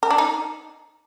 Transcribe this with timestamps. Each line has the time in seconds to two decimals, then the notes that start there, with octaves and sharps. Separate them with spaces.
0.03 A#4
0.11 D4
0.18 D#4